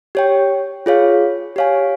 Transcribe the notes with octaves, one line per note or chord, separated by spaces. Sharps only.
G4 C#5 G5
F4 G#4 C#5 F5
G4 C#5 F5 G#5